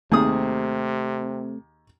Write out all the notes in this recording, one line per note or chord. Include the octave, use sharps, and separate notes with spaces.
D#2 C3 A3 C4 G#4 D#6